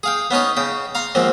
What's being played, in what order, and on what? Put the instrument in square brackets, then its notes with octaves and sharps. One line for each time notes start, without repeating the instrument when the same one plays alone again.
[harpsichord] G#4 F5 G5
B3 C#4 D#4 C#5
C#3 G5
F5 A#5 C6
D#2 G#2 F3 C4